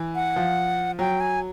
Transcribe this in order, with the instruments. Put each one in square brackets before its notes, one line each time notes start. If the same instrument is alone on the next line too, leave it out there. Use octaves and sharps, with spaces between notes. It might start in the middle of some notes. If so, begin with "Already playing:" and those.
Already playing: [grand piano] E3
[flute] F#5
[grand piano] F3
[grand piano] F#3 [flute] G5
[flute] G#5